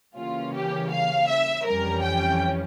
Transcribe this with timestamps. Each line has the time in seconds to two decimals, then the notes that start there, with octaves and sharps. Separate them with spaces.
0.16 C#3 E3 G3 A#3 C#4 F4
0.54 G4
0.90 F5
1.28 E5
1.65 F2 E3 G3 C#4 A#4
2.02 G5